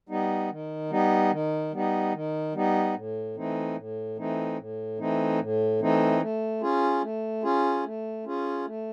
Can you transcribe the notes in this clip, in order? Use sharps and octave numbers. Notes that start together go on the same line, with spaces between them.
G3 B3 D#4
D#3
G3 B3 D#4
D#3
G3 B3 D#4
D#3
G3 B3 D#4
A2
E3 A3 C4 D#4
A2
E3 A3 C4 D#4
A2
E3 A3 C4 D#4
A2
E3 A3 C4 D#4
A3
C#4 F4 G#4
A3
C#4 F4 G#4
A3
C#4 F4 G#4
A3